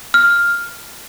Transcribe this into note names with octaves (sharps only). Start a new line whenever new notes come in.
F6